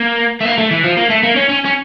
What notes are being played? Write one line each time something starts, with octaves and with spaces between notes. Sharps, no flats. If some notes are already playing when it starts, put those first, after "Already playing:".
Already playing: A#3
A3
A#3
A3
E3
F3
A#3
A3
A#3
C#4
C#4
C#4